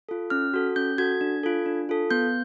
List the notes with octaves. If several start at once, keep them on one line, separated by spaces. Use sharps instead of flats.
F4 A4
C#4 F6
F#4 A4
C#4 G6
F#4 A4 G#6
D4
F4 A4
D4
F4 A4
B3 G6